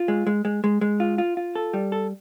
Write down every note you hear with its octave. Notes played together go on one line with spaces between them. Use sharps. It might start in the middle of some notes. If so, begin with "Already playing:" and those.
Already playing: F4
G#3
G#3
G#3
G#3
G#3
F4
F4
F4
A4
G3
A4